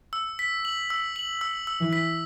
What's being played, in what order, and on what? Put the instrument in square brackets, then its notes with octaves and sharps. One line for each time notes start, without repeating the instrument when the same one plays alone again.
[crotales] E6
B6
F#7
E6
F#7
E6
E6
[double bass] E3
[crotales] B6